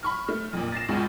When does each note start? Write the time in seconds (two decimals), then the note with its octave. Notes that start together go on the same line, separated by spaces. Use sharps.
0.03 B5 C#6 F6
0.28 A3 F6
0.53 F2 A#2
0.72 A6 A#6 C7 E7
0.88 G#1 C#2 B2 F4 G#4